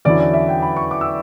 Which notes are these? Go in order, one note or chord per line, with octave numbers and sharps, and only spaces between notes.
E2 D3 F#3 C#4 E4 D5
D5
E5
G5
B5
C#6
D6
E6